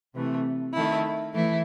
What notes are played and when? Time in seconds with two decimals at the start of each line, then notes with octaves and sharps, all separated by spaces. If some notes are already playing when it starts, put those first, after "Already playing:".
0.14 C3 E3 A3
0.73 D#3 A3 E4
1.33 E3 A3 E4